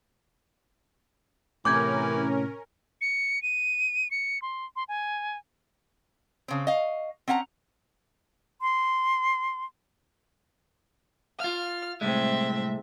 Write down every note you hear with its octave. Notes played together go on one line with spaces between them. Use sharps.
A2 C3 E3 C#4 A#4 D6 G6 G#6
C#7
D#7
C#7
C6
C6
G#5
C#3 C4
D#5 F5
C4 C#4 F#5 G#5 A#5
C6
F4 F5 F6
C2 A2 G#3 C4 E5